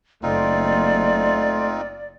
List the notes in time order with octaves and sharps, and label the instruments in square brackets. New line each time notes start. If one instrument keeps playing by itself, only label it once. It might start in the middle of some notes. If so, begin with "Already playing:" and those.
[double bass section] F#1 [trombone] A3 [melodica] C4 D#4 F4 [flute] D5